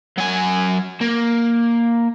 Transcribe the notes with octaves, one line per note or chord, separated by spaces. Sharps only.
F#3 G#5
A#3